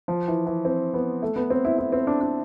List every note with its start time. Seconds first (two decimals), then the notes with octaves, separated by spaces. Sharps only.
0.08 F3
0.28 E3
0.47 E3
0.65 C4
0.94 B3
1.22 A3
1.36 B3
1.50 C4
1.65 E4
1.78 E4
1.92 C4
2.07 D4
2.21 D4